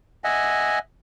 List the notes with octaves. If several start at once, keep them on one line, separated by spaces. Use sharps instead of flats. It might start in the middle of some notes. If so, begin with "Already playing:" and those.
D#5 E5 F#5 G#5